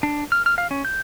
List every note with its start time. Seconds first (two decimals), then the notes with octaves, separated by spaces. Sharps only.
0.03 D4
0.32 F6
0.46 F6
0.58 F5
0.71 C#4
0.85 G6